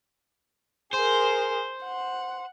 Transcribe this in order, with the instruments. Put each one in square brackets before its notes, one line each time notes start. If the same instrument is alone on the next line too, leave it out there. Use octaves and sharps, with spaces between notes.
[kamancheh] G#4 A#4 [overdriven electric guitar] C5
[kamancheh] F#5